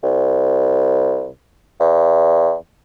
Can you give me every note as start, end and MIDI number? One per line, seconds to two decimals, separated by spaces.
0.03 1.32 36
1.80 2.55 40